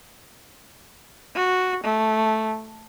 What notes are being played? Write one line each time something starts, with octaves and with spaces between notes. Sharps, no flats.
F#4
A3